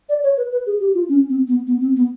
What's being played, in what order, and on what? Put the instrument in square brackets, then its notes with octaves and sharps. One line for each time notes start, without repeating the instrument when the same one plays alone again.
[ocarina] D5
C#5
B4
B4
G#4
G4
F4
C#4
C4
B3
B3
C4
B3